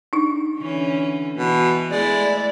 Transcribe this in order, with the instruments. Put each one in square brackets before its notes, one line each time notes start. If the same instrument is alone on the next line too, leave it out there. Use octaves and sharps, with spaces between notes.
[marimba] D4 D#4
[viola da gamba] D3 E3 C#4
[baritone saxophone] B2 [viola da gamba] E3 B3
[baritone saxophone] G#3 [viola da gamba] A3 E4 [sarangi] D5